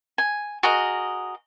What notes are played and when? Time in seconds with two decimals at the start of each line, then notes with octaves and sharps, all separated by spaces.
0.18 G#5
0.63 F#4 G#4 A#4 D#5